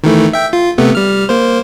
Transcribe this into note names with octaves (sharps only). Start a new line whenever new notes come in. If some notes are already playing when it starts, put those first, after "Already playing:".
D#3 E3 A3
E5 G5
F4
C3 A3 B3
G3 F6
A#3 C5